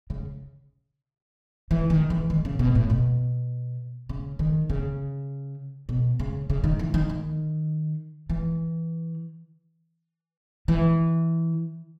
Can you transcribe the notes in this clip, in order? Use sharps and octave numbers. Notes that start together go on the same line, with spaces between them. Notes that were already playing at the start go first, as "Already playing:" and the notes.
C#3
E3
D#3
E3
D#3
C#3
B2
A2
B2
C#3
D#3
C#3
B2
C#3
C#3
D#3
E3
D#3
D#3
E3
E3